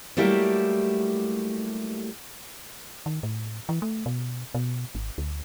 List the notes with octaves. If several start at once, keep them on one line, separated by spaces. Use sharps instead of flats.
F#3 G3 A3 A#3 E4 G4
D#3
A2
E3
A3
B2
B2
G#1
D2